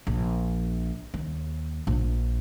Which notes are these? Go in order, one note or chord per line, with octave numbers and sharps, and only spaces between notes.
A#1
D#2
A#1